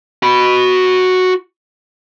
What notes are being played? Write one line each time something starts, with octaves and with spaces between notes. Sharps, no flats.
F#4 B5